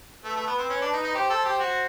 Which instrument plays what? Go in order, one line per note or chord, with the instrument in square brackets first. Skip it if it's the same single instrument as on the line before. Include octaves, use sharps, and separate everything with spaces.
[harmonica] A3 [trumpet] B4
[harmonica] A3
B3
C4
C#4
D4
D#4
D#4
[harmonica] G4 [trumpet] C5
[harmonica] A4
G4
F#4